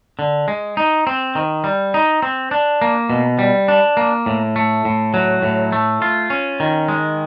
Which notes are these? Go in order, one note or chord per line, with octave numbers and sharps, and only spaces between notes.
D3
G#3
D#4
C4
D#3
G3
D#4
C4
D4
A#3
B2
G3
D4
A#3
A2
A3
A2
F#3
A2
A3
F4
C#4
D#3
G#3